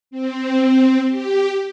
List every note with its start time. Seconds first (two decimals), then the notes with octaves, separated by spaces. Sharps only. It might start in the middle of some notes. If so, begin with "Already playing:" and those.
0.11 C4
1.08 G4